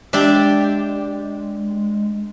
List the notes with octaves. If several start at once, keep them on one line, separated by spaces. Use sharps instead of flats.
G#3 D4 G4 D5 E5